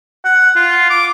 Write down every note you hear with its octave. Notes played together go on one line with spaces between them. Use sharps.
F#5
F4
D6